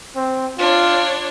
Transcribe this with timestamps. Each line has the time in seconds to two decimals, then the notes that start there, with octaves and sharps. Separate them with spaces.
0.16 C4
0.59 D4 F4 C#5